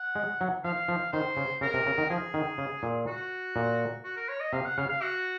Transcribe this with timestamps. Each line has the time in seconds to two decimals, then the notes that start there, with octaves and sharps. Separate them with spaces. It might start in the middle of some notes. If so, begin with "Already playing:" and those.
Already playing: F#5
0.15 G#3
0.41 F#3
0.64 F3 F5
0.88 F3
1.12 D#3 C5
1.37 C#3
1.61 C#3 A#4
1.74 C3
1.86 C#3
1.98 D#3
2.10 F3 G#4
2.34 D#3
2.58 C#3
2.83 A#2
3.07 F#4
3.56 A#2
4.04 F#4
4.17 A#4
4.29 C#5
4.41 D#5
4.53 C3 F5
4.65 F#5
4.78 C#3 F5
4.89 F5
5.02 F#4